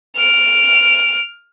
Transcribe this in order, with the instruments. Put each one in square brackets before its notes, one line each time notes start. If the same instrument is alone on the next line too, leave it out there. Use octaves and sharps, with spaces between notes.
[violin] F6 D7